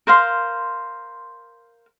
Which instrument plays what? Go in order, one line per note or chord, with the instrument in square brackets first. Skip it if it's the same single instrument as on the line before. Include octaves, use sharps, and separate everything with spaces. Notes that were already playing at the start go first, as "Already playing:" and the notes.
[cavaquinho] A#4 C5 F5 C6